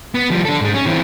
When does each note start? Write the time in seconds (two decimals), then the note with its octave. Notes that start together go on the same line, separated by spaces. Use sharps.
0.15 B3
0.30 F3 G3
0.45 D4 A4
0.61 G#2 G#3
0.74 C#4
0.86 E3 C4